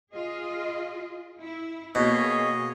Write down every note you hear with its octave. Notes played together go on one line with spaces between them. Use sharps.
F4 G#4 D#5
E4
B2 A#3 G#4 C#5 D#5